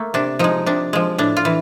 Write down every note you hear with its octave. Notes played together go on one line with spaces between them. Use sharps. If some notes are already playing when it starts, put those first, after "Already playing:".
Already playing: A3 A#3
C3 D4
F3 G#3 D#4
C3 D4
F3 G#3
A2 D4
F4
E3